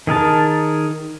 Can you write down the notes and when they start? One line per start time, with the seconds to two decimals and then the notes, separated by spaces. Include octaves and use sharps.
0.07 D#3 G#4 A#4 A5